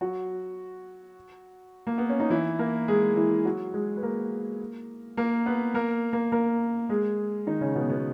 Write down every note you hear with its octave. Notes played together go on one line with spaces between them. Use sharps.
F#3 F#4
A#3
B3
C#4
D#4
E3 E4
A#3 A#4
G#3 G#4
E3 E4
F#3 F#4
G#3 G#4
B4
A#3 A#4
A#3 A#4
B3 B4
A#3 A#4
A#3 A#4
A#3 A#4
G#3 G#4
D#3 D#4
C#3 C#4
B2 B3
B2 B3